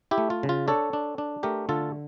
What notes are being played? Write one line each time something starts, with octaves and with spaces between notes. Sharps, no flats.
E4 G4
A3
F4
C#3
F4
D4 A4 C#5
D4
D4
A3 G4 A#4
D3 F4 A4